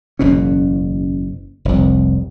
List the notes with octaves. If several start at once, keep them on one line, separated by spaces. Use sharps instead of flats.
F#1 E2 B2 C#4
F1 C2